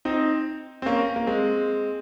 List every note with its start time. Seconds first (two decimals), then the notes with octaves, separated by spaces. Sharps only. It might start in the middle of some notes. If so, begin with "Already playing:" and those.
0.05 C4 D#4
0.82 C4
0.86 A#3 C#4
1.16 A#3
1.27 G#3 C4